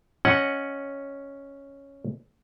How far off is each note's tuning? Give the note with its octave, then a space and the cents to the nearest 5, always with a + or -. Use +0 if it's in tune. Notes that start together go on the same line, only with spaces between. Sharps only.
C#4 +0 D#5 +0 F#5 +0